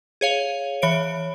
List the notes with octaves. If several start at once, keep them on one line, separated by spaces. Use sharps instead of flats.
G#4 C#5 F5
E3 C#5 D7